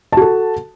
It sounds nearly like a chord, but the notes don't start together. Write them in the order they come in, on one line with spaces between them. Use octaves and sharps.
A5 F#4 A4